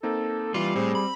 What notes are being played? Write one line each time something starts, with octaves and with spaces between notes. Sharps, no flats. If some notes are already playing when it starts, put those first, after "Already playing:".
A#3 C4 D#4 A4
E3 G3 F4
A2 C4 G#4 C5
B5